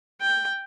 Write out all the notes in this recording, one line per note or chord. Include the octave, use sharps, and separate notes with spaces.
G5